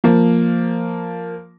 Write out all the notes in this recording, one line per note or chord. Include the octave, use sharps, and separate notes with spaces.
F3 A#3